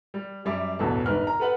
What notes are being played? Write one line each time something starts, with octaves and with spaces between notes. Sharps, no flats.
G3
F#2 G3 E5 D6
A1 E2 G2 B2 A4 A5
G1 G#2 A#4 B4 F6
A#5
A4 B4 F#5